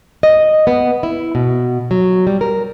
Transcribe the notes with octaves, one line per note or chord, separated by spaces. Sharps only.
D#5
B3
E4
B2
F#3
G3
A#4